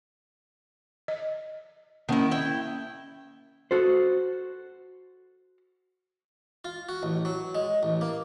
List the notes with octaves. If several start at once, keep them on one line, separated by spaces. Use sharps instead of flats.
D#5
D#3 A#3 C#4 E4
E4 G5
F#4 A4 C5
F4
F#4
A1
F#3
G#3
A1
A#3